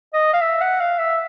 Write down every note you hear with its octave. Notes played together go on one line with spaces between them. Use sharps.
D#5
F5
E5
F#5
F5
E5